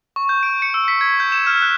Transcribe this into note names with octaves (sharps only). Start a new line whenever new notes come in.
C#6
G6
D7
C#7
E6
B6
G#6
G6
E7
F6
F#6